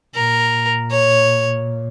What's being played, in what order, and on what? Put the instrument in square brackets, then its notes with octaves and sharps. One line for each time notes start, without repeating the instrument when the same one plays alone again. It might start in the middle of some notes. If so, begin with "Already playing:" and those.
[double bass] A#2 [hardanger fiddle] A#4
[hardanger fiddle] C#5